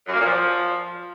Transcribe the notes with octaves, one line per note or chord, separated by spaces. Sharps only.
F#2
A#3
A#2
F3